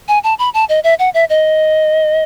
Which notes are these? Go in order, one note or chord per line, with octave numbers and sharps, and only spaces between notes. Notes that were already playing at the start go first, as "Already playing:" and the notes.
G#5
A5
B5
A5
D#5
E5
F#5
E5
D#5